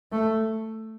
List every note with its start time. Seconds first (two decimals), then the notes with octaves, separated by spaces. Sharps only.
0.12 A3